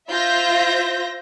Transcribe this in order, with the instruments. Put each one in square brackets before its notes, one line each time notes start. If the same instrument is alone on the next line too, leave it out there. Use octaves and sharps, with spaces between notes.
[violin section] F4 C5 E5 G6 A#6